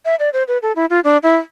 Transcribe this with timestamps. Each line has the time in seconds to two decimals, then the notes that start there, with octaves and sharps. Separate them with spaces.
0.05 E5
0.19 D5
0.33 C5
0.48 B4
0.62 A4
0.76 E4
0.90 F4
1.04 D4
1.23 E4